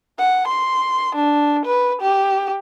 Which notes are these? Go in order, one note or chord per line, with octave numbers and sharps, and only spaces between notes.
F#5
C6
D4
B4
G4